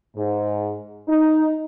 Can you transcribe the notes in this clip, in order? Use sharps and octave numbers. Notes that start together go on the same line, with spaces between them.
G#2
D#4